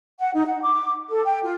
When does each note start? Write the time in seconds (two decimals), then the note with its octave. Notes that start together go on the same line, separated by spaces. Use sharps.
0.19 F#5
0.34 D#4
0.46 F#5
0.61 D6
1.09 A4
1.24 G5
1.44 F4